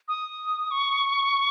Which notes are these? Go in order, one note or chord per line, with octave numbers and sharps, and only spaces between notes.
D#6
C#6